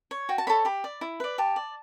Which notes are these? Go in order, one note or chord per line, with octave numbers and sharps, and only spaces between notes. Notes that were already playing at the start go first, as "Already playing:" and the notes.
C#5
F#4 G5
A5
A4 C#5 B5
G4 B5
D5
E4
B4 D5
G4 A5
D5